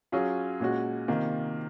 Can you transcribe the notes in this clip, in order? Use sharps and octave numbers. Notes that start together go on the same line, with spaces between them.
F#3 C#4 F4 G#4
A#2 G#3 C#4 F#4
C3 D#3 A#3 F4